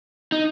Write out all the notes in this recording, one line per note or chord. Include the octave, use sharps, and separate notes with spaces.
D#4